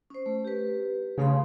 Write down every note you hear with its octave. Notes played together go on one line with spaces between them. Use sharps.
C#4 C5
A3
G4 B4
C#3 A3 F5 C6